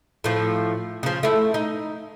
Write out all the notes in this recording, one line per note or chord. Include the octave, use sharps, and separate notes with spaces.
A2 F3
C#3 F3
A3 E4
D#4